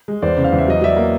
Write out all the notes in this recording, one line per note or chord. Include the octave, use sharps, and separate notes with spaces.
G#3
E2 C5 D5
C#3
F5
E2
E5
F#3 D#5
F#3 D5 E5
A#3